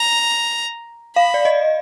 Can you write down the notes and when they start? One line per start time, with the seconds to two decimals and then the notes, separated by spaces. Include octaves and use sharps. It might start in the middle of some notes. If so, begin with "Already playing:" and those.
Already playing: A#5
1.16 F5 B5
1.34 D5
1.45 D#5